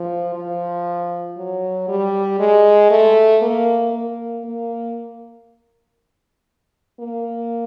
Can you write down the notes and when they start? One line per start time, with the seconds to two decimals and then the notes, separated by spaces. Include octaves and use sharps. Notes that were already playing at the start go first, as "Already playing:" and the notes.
Already playing: F3
0.35 F3
1.37 F#3
1.89 G3
2.40 G#3
2.91 A3
3.42 A#3
3.93 A#3
4.44 A#3
7.00 A#3